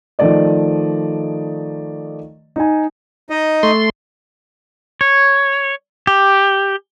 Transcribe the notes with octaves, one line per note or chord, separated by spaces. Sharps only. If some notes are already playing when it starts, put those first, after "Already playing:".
D#3 F3 A3 D5 D#5
D#4 G#5
D#4 D#5
A3 C6
C#5
G4